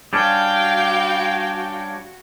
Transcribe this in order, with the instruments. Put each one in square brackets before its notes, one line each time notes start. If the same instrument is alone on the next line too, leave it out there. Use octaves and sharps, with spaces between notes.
[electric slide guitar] G3 C#4 D4 [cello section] F#4 [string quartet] F5 G5